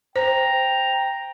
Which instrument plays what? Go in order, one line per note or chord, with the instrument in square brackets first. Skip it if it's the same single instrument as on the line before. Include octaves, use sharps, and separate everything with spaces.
[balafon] C5 [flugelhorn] G5 [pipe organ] A#5